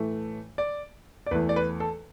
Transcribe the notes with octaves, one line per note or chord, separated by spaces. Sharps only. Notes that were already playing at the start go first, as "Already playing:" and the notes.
Already playing: A2 E3 A3
D5
D5
E2 E3 A3 B4
D5
B4
A4